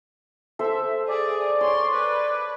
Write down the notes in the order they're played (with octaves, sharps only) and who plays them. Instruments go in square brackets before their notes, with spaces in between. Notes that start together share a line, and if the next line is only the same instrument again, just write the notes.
[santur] A4 C5 [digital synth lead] E5
[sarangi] G#4 [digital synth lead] D5
[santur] C#5 [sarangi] C6
[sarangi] B4